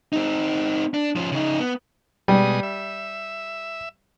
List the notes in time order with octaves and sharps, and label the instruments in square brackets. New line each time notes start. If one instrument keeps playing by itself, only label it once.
[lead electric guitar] C4 D#4
D4
F3 C#4
C#3 D#4
B3
[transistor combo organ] B2 G#3 D#6 [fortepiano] G3
[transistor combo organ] E5